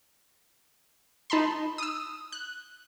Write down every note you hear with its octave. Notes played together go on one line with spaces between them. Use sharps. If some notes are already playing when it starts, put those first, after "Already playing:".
D#4 A5 B5 C6
D#6 E6
F#6